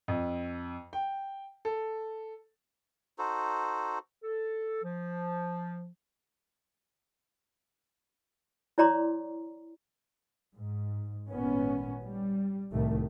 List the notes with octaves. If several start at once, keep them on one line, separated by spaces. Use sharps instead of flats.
F2
G5
A4
D#4 F#4 A4 C5
A4
F3
E4 C#5 D5 A#5 C6 D6
G#2
G#1 A#2 B3 C#4
G3
C2 A2 D#3 A3